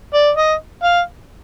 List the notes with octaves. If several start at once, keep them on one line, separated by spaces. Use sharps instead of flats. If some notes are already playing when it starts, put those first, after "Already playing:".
D5
D#5
F5